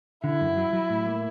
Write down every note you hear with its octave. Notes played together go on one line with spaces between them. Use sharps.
D3 E4
F#2
F#3
F#3
A2
A#3